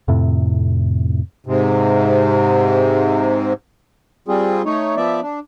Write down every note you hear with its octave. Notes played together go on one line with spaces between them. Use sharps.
F2 A2 C3
G#2 C3
G3 C4 F4 G#4
A3 D#4 C#5
F3 B3 D5 E5
D4